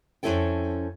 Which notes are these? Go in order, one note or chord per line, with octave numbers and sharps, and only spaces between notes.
F2 D#3 C#4 E4 A4 G5